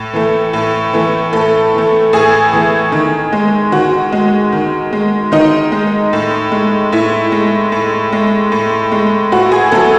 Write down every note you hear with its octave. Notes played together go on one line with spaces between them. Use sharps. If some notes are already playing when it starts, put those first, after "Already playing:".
Already playing: A2
E3 A3
A2
E3 A3
A2 A4
E3 A3
A2 G#4
E3 A3
D#3
G#3
D#3 F#4
G#3
D#3
G#3
D#3 D#4
G#3
A2
G#3
A2 E4
G#3
A2
G#3
A2
G#3
A2 F#4
G#4
F#3 A3 A4